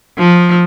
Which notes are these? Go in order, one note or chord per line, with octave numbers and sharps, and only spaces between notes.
F3